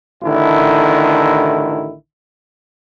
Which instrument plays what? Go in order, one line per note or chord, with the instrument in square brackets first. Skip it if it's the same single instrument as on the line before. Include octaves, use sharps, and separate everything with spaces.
[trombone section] A1 D3 D#3 E4